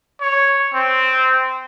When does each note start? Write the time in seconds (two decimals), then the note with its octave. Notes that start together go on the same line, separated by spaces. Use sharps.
0.21 C#5
0.74 C4